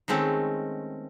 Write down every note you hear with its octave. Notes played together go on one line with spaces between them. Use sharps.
D#3 G#3 A3 C4 C#4